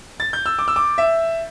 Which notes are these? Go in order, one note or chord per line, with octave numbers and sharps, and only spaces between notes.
A6
G6
E6
D6
E6
D6
E5